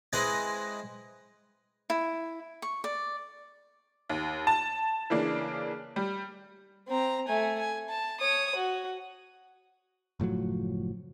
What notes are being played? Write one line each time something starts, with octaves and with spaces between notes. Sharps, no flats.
G#3 C4 E4 B4 D#5 G#5
E4
C#6
D5
D#2
A5
C#3 E3 A#3 D4
G3
C4 A#5
A3 G#5
G#5
A5
C#5 D#6
F#4
F#1 A2 F3 F#3